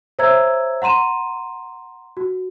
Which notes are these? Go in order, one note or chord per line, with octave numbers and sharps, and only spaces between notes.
C5 C#5 E5 A#5 E6 G#6
F#5 A#5 C6 D#7 E7
F#4